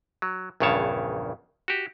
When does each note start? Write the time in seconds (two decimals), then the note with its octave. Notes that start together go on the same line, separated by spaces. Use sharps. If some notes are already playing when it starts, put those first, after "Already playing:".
0.22 F#3
0.60 A#1 E2 G2 C#3 C#5 A5
1.68 F#4 G4